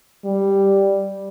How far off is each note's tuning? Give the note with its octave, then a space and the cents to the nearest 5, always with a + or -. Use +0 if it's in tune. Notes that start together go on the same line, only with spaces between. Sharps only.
G3 +0